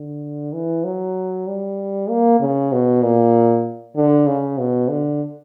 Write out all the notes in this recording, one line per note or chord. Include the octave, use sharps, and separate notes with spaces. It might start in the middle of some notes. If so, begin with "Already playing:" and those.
Already playing: D3
E3
F#3
G3
A#3
C#3
B2
A#2
D3
C#3
B2
D3